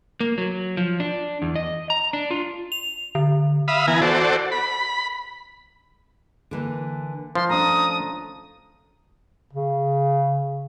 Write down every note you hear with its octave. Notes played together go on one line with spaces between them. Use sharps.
A#3
F#3
F3
D4
E2
D#5
A#5
D4
F4
F7
D3
E5 F5 B5 D#6
E3 B3 G#5 A#5
F#4 A4 C5 D5
B5
D3 E3 A#3
F3 D4 C6
A3 C#4 D4 A#5 D#6
C#3